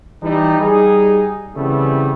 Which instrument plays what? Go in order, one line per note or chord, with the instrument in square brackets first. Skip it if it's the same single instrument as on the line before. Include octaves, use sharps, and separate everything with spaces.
[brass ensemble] E3 G3 D#4
G3 D#4 G#4
C#3 E3 G3 A3 B3 C4